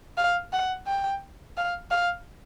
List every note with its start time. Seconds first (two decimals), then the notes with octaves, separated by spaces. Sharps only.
0.18 F5
0.53 F#5
0.87 G5
1.57 F5
1.91 F5